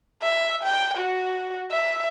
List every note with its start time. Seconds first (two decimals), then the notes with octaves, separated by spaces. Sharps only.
0.22 E5
0.63 G5
0.98 F#4
1.71 E5